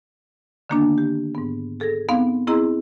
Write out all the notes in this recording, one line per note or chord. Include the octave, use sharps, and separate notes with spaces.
D3 D#3 A#3 B3 D4
G4
G#2 B3
G#4 A4 G#6 A#6
B3 C4 D#4 F5
C4 E4 G#4 D#5 A#5 C6